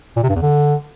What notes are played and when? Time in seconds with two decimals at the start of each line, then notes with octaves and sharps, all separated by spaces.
0.16 A#2
0.23 C3
0.29 G2
0.36 E2
0.42 D3